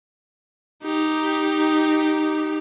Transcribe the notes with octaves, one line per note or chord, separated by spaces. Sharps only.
D#4 G4